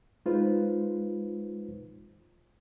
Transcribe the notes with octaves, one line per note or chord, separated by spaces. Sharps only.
G#3 D#4 F4 B4 C5